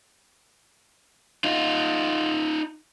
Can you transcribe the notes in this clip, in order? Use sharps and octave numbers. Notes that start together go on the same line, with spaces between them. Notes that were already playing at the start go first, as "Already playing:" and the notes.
D#4 F4